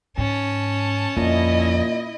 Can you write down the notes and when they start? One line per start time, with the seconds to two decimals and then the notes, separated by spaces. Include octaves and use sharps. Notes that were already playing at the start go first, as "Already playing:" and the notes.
0.18 G#2 C#4 A5
1.17 F2 A#2 E4 D#5